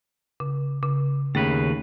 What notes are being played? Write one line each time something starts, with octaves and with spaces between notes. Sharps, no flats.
C#3
C#3
D#2 C#3 A3 B4